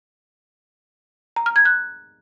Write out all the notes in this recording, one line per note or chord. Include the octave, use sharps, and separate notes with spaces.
A#5
F6
G#6
F#6